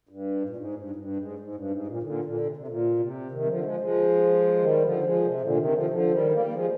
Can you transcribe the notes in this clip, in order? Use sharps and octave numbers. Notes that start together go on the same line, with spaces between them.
G2
G#2
A#2
G#2
G2
G#2
G2
G#2
G#2
G2
G#2
A#2
A#2 D3
A#2 D3
A#2
C3
C3
A#2
C3
C3 D#3
G3
D3 F3
F3 G#3
F3 G#3
D#3 G3
D3 F3
F3 G#3
C3
A#2 D3
C3 D#3
D3 F3
D#3
D3 F3
D#3 G3
G3 A#3
A#3
F3 G#3